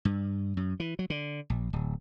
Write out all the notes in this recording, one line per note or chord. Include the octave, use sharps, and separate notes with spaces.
G2
F#2
E3
F#3
D3
A#1
D1